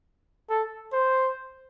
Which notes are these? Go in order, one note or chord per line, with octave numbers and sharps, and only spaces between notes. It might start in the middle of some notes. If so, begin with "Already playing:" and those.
A4
C5